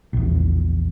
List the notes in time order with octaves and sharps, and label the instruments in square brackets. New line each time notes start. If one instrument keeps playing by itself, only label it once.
[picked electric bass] A#1 E2